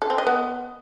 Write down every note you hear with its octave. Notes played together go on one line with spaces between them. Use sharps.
A4
C4
D#5
B3